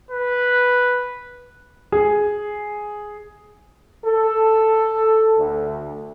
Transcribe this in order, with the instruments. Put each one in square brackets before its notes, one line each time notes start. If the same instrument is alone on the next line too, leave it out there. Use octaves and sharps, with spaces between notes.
[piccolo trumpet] B4
[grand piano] G#4
[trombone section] A4
D2